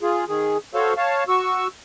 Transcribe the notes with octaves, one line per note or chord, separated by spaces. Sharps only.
F4 G#4
D#3 G#4
F#4 A4 C5 C#5 F5
C#5 F5 A5
F#4 C#6 E6